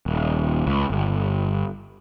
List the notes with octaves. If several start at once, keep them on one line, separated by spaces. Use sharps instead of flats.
D#1
C#2
G1